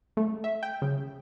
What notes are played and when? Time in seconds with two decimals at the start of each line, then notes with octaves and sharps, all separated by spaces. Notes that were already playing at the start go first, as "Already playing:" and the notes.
0.17 A3
0.44 E5
0.63 G5
0.82 C#3